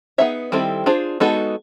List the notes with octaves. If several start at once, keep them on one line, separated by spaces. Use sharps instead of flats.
B3 D#4 G#4 C#5 E5
D#3 G3 C4 E4 A4
D4 F4 G#4 C5
G#3 B3 D#4 F#4 A4